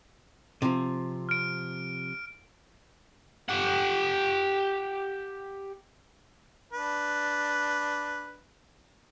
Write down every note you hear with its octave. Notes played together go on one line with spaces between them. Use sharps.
C3 F3
F6 D7
G4 F#5
D4 B4